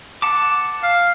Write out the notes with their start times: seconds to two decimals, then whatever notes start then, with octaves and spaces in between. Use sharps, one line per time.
0.22 F#5 A5 D6
0.83 F5